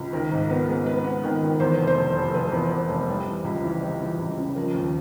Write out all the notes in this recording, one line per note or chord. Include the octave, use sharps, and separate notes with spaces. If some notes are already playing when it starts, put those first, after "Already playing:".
Already playing: C#2
D#3 A#4
G#2
B3
G#3
B3 B4
B3
D#3
D#3
E2 C5
F1 B4
C5
F1
F1
F1 B4
E2
E2
F1
G3
E3
C#2
E3
G3
E3
C#2
C#3
F3 A#4
D#2